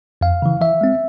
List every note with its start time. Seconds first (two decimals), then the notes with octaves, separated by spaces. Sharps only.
0.21 F2 F5
0.42 C#3 E3
0.61 E3 E5
0.81 G#3 C4